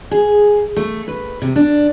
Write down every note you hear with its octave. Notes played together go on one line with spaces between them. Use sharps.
G#4
A3
B4
C3
D4